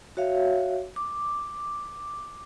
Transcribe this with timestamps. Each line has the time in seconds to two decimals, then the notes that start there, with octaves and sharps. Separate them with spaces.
0.17 F#4 C#5 E5 F5
0.96 D6